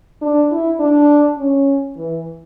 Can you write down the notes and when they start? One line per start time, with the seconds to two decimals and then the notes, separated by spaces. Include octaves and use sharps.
0.22 D4
0.51 E4
0.80 D4
1.38 C#4
1.96 E3